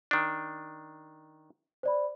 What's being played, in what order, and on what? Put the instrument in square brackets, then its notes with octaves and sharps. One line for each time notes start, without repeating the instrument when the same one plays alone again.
[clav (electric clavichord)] D#3 D4
[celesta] C5 D5 B5